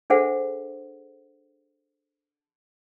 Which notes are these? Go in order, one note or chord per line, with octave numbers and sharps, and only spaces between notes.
D4 G#4 A4 C5 E5 F#5